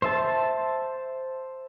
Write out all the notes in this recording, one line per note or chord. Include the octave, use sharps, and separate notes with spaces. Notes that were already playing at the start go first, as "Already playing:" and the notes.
C5 E5 A5